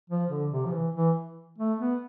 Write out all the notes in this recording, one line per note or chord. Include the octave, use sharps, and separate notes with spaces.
F3
D3
C3
F3
E3
E3
A3
B3